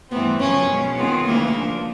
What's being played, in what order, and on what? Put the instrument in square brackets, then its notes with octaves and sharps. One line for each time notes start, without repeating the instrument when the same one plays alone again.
[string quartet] G2 E3 A3 C4 [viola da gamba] B3
[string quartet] F#2 C#3 F3 [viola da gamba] C#4
[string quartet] B2 G#3 C#4
[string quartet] D#3 G#3 C4 F4 G#4 [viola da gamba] B3
[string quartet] D2 C#3 E3 G#3 [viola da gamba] A#3
[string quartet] F3 A#3 D4